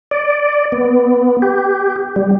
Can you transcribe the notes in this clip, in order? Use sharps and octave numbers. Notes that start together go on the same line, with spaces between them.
D5
B3
G4
G3